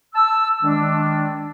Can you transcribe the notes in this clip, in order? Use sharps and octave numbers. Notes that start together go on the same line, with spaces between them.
A5 E6
D#3 G#3 D4